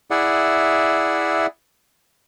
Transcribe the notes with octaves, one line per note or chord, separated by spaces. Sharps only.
E4 G#4 D5 E5 F#5